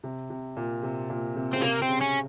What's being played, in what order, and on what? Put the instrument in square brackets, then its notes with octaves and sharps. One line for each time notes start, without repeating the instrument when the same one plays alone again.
[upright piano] C3
C3
A#2
C3
A#2
C3
[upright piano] C#3 [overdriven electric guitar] C4
[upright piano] C3 [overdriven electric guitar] A#3
[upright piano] C3 [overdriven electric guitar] C4
[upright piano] C#3
[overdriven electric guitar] C#4